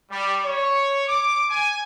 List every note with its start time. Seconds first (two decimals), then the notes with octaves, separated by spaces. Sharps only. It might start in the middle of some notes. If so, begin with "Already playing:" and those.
0.11 G3
0.45 C#5
1.08 D6
1.50 G#5